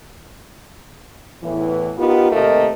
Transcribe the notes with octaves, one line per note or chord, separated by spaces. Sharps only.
E2 A2 E3
B3 D#4 F4 G4 A#4
D#2 C3 A3 A#4 D#5